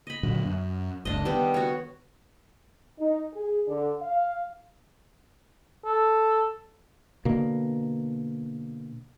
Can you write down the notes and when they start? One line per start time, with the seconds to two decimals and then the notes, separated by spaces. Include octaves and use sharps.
0.07 D#5 B5
0.23 A#2 D3 F#3
0.45 F#2
1.05 F#1 C#2 D4 D#5
1.25 D#3 G3 B3 G4
1.54 F#4 C#5
2.99 D#4
3.33 G#4
3.68 D3
4.01 F5
5.85 A4
7.25 B2 D3 A#3